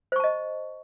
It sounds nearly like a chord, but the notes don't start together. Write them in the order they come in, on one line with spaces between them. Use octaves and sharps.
C5 C#6 A5 D#5